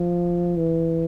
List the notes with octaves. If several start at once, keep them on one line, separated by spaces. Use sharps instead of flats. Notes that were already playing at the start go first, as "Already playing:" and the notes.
Already playing: F3
E3